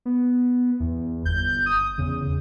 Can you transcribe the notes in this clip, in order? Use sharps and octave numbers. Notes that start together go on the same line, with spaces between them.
B3
E2
G1 G6
D#6
E2 C#3